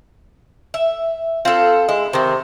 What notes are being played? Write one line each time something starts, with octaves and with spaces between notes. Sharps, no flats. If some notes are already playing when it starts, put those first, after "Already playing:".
E5
C4 F4 A4
G#3 E4
C3 D#3 C4